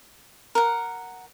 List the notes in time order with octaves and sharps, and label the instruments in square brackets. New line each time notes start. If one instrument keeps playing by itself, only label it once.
[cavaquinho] A#4 F#5